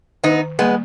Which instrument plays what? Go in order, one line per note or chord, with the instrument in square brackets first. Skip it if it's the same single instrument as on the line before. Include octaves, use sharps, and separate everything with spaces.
[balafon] D#3 [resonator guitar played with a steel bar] B3 D#4
[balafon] G3 A#3 [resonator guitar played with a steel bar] G#3 B3